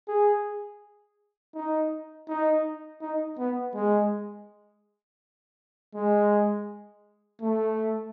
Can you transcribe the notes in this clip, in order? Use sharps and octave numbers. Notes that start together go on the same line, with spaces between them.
G#4
D#4
D#4
D#4
B3
G#3
G#3
A3